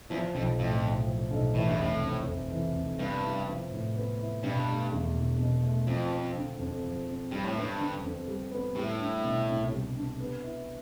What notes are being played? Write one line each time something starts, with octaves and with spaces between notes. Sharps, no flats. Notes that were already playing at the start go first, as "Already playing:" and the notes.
E2 F3
B1 F2
F2 A2
B1
F3
B1
A2 E3
G2
F1 A2
F2
F1
E3
F1
G2 B3
E4
F3
A2
B3
E4
G2 B2
A3
E2
E1
B2
A3
F2 F3
C4
D3
F2
F3
C4
G2 G3
A2
G2 B3
D3
F2
G3
B3
A2 G3
D4
B2
C2
G3
D4
B3
E4